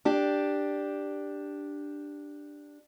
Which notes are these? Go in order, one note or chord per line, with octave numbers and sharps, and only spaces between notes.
D4 G4